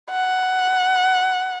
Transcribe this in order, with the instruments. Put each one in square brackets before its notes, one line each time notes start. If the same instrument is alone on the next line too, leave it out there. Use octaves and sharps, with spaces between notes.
[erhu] F#5